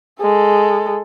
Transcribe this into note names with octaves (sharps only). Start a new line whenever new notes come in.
G#3 A4